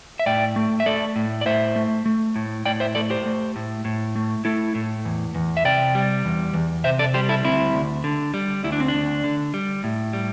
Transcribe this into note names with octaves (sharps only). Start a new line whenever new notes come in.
E5
A2 D5 G5
A3
E5
A3 A4 D5
A2
D5
A2 C5 E5
A3
A3
A2
A2 D5 G5
C5 E5
A3 A4 D5
G4 C5
A3
A2
A2
A3
A3 E4 A4
A2
E2
E2
E5
C3 D5 G5
G3
E2
E2
C3 C5 E5
A4 D5
G3 G4 C5
E4 A4
D2 C4 E4
D2
D3
G3
D2 E4
D4
C4
D4
D2
D3
G3
A2
G3